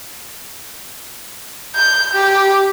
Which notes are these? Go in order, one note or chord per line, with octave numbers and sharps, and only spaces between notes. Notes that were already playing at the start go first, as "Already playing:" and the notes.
G6
G4